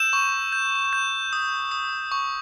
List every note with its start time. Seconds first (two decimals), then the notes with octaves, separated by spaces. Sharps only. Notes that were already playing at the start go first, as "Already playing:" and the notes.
Already playing: E6 G6 E7
0.13 C#6
0.52 G6
0.93 G6
1.33 D#6
1.71 D#6
2.12 C#6